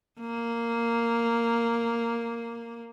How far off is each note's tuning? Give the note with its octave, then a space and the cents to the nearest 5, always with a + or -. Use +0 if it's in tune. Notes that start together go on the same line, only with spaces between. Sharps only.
A#3 -5